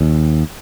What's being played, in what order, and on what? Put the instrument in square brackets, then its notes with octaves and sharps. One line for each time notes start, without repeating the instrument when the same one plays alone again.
[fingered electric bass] D#2